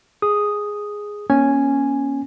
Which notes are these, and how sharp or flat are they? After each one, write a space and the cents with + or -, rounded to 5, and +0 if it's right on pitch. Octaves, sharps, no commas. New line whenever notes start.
G#4 +0 D#6 +0
A#3 +40 C#4 +0 G#5 +0